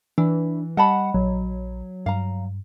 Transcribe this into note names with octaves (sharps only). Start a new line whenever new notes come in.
E3 D4 E4
G3 D#5 F#5 A5 B5
A#1 F#3
G2 F5 A#5